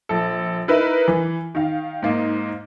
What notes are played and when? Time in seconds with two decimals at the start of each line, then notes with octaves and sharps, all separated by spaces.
0.09 A#1 A4
0.68 D#4 E4 A#4 B4 E5
1.08 E3
1.55 D#3 F5
2.02 G#2 A#3 D#5